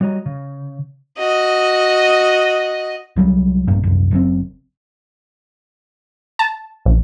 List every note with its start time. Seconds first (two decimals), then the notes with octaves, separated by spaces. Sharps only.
0.01 G3 F#4 C#5 D#5 A#5
0.26 C#3
1.18 F#4 D#5
3.16 C2 F#3 G3
3.67 E1 A#1 G2 A#2
3.83 C2 F#2
4.11 F#1 F#2 B2 C4
6.39 A5
6.85 A#1